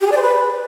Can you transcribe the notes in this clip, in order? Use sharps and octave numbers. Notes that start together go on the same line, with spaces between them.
G4
G#4
D5
C5
B4